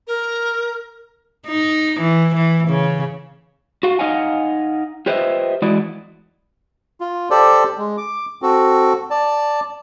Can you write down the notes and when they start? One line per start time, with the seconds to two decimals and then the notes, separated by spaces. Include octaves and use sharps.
0.07 A#4
1.47 D#4
2.01 E3
2.36 E3
2.69 C#3
3.83 F#4 F5
3.99 D#4 D#5 F5 F#5 G#5
5.06 F4 G4 B4 C5 D#5 E5
5.62 E3 G#3 E4 F#4 D5 D#5
7.00 F4
7.30 G4 A4 C5 D5
7.78 G#3
7.97 D6
8.42 C4 F#4 A4
9.10 D5 A5